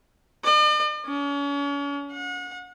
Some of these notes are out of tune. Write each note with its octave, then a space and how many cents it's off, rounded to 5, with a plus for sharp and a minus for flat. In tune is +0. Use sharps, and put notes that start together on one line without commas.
D5 +45
C#4 +40
F#5 -35